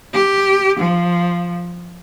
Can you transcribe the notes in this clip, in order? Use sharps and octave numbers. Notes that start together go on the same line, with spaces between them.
G4
F3